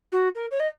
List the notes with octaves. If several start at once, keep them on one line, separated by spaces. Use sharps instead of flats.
F#4
A#4
C#5
D#5